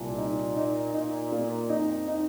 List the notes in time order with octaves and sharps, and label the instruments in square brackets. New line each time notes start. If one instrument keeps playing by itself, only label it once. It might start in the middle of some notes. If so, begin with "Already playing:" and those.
Already playing: [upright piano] C2 [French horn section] A#2
[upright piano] D#4
D#4
[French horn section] A#2 [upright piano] D#4
[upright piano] A#3
[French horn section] F2 [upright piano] D#4
[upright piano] D#4